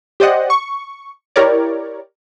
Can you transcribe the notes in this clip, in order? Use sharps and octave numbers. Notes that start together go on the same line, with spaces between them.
G4 C5 D5 D#5 F#5
C#6
E4 G4 A#4 C#5 D5